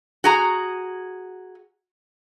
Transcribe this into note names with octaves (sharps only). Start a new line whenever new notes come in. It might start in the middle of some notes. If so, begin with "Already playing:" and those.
F#4 G#4 A#5